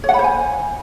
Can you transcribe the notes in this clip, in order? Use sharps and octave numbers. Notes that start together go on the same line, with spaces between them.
C#5
F#5
B5
C5
G#5